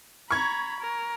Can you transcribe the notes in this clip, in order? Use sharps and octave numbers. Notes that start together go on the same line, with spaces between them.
A#5 B5 C#6 G#6
A#4